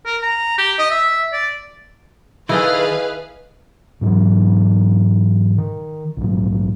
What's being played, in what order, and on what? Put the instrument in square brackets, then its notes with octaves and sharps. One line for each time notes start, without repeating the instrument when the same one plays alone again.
[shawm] A#4
A#5
G4
D#5
E5
D5
[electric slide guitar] D#3 A4 [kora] E4 D#5 [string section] G#4 B4 F5
[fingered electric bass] G#2 E3 F#3
D#3
A#1 G#2 F#3